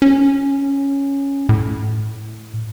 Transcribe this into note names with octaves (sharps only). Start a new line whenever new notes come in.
C#4
A2